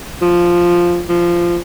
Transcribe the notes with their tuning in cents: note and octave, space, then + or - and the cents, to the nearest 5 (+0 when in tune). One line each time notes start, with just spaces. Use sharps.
F3 +0
F3 -15